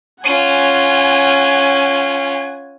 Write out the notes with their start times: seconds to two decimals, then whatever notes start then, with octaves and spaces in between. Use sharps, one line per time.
0.24 C#4 F4 F#5 G#5